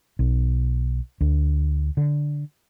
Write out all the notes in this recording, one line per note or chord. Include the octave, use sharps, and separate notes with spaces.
B1
D2
D3